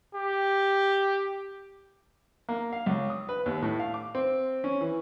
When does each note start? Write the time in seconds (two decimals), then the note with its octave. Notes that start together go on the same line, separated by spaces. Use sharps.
0.15 G4
2.49 A#3
2.72 F5
2.86 C#2
3.10 D#6
3.29 B4
3.46 D#2
3.62 A2
3.79 F5
3.94 D6
4.15 C4
4.64 C#4
4.81 E3